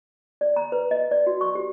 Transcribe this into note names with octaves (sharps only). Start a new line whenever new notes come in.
D5
A#5
B4
D#5
D5
F#4
C#6
G4